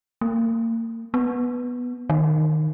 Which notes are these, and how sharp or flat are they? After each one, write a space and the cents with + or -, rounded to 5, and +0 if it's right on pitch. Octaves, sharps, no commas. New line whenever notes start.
A#3 -35
B3 -5
D#3 -10